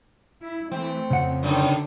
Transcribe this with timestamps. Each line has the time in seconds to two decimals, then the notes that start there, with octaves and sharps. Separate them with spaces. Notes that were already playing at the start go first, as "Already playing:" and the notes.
0.42 E4
0.71 E3 A3 C4
1.10 F2 C#3 F#5
1.43 F#2 A2 D3 D#4